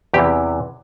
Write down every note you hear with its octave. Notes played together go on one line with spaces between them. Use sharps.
E2 C3 E3 G4